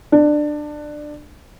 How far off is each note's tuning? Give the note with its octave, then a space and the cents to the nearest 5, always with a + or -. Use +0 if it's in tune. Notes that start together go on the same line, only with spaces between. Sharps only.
D4 +20